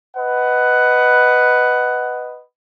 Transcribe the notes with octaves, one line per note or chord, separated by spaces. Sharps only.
B4 D#5 F#5